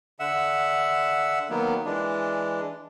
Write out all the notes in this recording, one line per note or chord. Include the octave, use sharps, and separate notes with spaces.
D3 E5 F#5 E6
D#3 F#3 A#3 B3
E3 G#3 D4